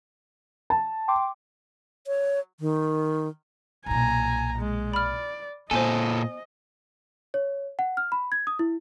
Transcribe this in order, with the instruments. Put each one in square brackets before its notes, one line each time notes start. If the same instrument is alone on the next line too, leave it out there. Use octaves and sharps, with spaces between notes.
[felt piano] A5
[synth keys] G5 C6 D6
[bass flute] C#5
D#3
[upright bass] B1 A#2 [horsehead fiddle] G#5 A#5
[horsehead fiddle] G#3
[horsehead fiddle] D5 [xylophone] B5 F6
[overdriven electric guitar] A#2 A4 [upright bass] B3 [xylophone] C5 G#5 [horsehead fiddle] D#5
[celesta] C#5
F#5
F6
B5
G#6
D#6
E4